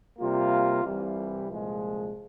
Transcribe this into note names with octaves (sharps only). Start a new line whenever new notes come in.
C3 G3 A#3 F4
C2 C3 E3 G3
C2 A#2 F3 G#3